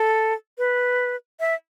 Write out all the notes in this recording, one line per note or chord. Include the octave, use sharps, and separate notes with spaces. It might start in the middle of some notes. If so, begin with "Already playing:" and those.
Already playing: A4
B4
E5